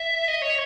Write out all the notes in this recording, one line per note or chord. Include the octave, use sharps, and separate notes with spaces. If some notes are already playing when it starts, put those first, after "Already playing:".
Already playing: E5
D#5
C#5